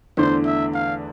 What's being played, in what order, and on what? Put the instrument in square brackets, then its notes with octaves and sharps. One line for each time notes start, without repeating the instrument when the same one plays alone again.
[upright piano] E2 D3 A3 D4 [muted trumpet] C5
[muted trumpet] E5
F5